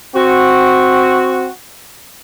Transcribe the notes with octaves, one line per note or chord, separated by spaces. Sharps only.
C4 F#4